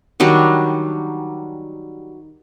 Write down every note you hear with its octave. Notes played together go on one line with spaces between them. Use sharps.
D#3 F#3 G3 D4